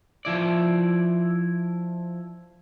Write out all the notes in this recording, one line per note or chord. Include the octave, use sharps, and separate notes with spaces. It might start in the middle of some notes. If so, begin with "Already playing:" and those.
F3 E4 D5